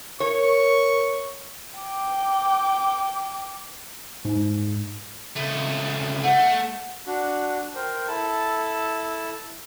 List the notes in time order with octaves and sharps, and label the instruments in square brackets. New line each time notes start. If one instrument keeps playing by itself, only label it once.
[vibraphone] A#4 [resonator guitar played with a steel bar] C#5 [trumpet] C#6
[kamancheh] G5 D6
[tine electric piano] G#2
[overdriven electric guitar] C#2 A3
[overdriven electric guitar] A3 [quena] F#5
[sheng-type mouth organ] D4 F#4
A#4 C5 G5
E4 A4 A5